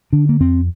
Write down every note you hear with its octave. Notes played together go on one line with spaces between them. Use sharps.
D3 D4
A#3
F2 C4